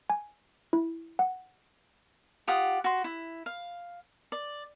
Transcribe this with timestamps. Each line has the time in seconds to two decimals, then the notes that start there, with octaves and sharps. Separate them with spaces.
0.10 G#5
0.73 E4
1.19 F#5
2.48 F4 G4 F#5 D#6
2.84 F#4 C6
3.04 E4
3.46 F5
4.32 D5